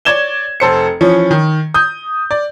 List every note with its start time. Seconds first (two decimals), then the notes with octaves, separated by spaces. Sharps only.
0.05 C#5 D5 G#6 E7 G7
0.60 F1 A4 C5 C#7
1.01 E3 F3 C#4
1.31 D#3
1.74 D#6 G6
2.31 D5